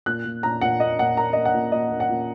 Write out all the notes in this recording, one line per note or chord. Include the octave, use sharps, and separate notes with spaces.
A#2 F#6
A#2
A#2 A#5
A#2 F#5
A#3 D#5
A#2 F#5
A#3 A#5
A#3 D#5
F#5
A#2
A#2 D#5
A#3
F#5
A#2